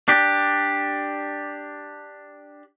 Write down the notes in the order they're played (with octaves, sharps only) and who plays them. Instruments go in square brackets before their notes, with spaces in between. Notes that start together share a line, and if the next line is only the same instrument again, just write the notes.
[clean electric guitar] D4 G4